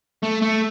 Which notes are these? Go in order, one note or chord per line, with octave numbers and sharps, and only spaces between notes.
A3
A3